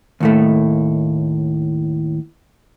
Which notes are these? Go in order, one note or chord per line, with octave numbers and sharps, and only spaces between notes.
D#2 A2 A3